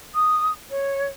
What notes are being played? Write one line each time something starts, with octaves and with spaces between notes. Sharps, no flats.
D#6
C#5